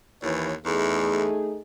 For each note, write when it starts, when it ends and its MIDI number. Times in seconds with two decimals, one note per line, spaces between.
0.23 0.55 39
0.23 0.51 52
0.23 0.51 73
0.66 1.26 40
0.66 1.61 57
0.66 1.61 63
0.66 1.61 68